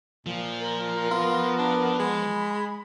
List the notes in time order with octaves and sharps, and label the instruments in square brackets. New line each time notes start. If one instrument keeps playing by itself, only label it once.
[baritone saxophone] A#2 [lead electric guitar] F3
[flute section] A#4
[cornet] B3 [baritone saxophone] F4
[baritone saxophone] D4
[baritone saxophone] G#3 [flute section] B5